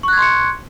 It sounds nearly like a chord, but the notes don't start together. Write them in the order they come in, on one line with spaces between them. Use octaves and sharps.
C#6 F#6 G#6 C6 C#7